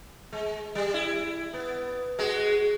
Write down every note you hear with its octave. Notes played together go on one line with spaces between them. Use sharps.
G#3
G3
E4
B3
G#3 F#4 G#4